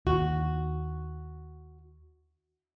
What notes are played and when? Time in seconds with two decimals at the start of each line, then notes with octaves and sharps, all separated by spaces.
0.07 D#2 F#4